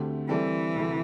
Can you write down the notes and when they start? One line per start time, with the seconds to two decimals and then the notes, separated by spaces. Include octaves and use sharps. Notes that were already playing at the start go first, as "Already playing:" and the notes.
Already playing: D2 D3 A3 C4 G4
0.29 E3 G3 C4 A4 D5
0.76 D2 C3 A3 E4